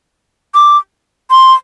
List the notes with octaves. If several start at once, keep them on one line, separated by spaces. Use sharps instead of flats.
D6
C6